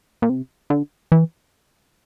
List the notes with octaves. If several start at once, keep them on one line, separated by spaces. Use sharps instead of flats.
A#2
C3
D3
E3